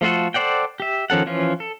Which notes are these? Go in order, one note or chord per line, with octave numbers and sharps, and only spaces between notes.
F3 A3 F4 F#4 A4
A4 C5 D5 F#5 G5
G4 E5
D#3 F3 C#4 A4 F#5
E3 F3 C#4 F4
A4